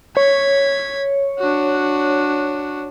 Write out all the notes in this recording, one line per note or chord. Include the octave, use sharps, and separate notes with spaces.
C#5 G#6 B6
D4 F#4